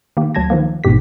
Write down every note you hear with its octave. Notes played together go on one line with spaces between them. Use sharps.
D#3 A#3 G4
D2 F#3 A5 G#6 A#6
D#3 F3 A#3
A1 G#2 B2 G4 B6